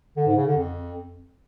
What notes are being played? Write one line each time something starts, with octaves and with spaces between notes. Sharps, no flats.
D3
G#2
C#3
D3
F2